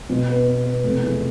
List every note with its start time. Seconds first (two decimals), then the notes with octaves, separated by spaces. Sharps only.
0.10 B2
0.29 B3
0.48 B3
0.66 B3
0.84 F1
1.03 E2